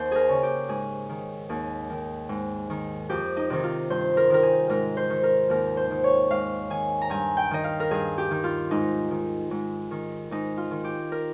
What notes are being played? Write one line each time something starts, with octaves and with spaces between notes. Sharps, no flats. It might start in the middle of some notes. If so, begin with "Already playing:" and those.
Already playing: D#2 C5
G#4 A#4
C#3
G4
G#2 G#4
D#3
D#2 G#4
D#3
G#2
D#3
F2 G4
D#4
C3 D#3
F4
G2 C5
A#4
D#3 A#4
G#4
G#2 A#4
C5
D#3
A#4
D#2 A#4
C5
D#3
C#5
G#2 F5
D#3 G#5
A#5
G2 G#5
G5
D#3 D#5
F5
A#4
G2 G#4
G4
D#3
F4
G#2 D#4
D#3
G#2
D#3
G#2 D#4
F4
D#3
G4
A#4